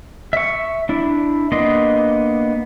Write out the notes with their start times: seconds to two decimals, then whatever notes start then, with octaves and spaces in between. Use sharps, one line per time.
0.33 E5 C#6
0.89 D4 E4
1.52 A#3 B3 D4 D#5 C6